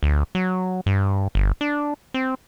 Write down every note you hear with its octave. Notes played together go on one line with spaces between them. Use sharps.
D2
F#3
G2
G1
D4
C4